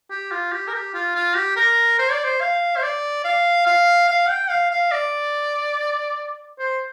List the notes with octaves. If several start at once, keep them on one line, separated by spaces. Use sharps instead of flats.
G4
F4
G4
A#4
G4
F4
F4
G4
A#4
C5
D5
C5
F5
C5
D5
F5
F5
F5
G5
F5
F5
D5
C5